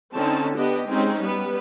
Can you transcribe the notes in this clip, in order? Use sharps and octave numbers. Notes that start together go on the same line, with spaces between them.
D3 C4 C#4 D#4 A5
B3 D4 G4 D#5
G#3 C4 C#4 D#4
G3 B3 B4